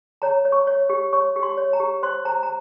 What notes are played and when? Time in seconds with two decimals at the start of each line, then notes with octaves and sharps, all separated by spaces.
0.22 C#5 A#5
0.45 C#5
0.52 C#6
0.67 C#5
0.89 G4
1.13 C#5 C#6
1.36 G4
1.43 C6
1.57 C#5
1.73 A#5
1.80 G4
2.03 C5 C6
2.25 C5 A#5
2.43 A#5